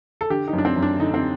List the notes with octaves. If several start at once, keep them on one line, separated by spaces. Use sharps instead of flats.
A4
D3 G4
D#4
F#2
D4
C4
F#2
D4
D3 D#4
C4